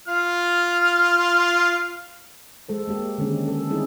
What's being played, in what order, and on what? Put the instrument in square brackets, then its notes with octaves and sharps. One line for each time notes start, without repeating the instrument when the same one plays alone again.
[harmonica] F4 F6
[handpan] G#3 A4 C5
G#3 A#3 G4
D3 D#3 G#3 C#4
C#4
A4
G3 C4 D#4 E4 G#4